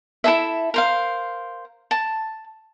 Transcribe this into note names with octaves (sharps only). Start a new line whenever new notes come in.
E4 G#4 A4 E5
A#4 C5 F5
A5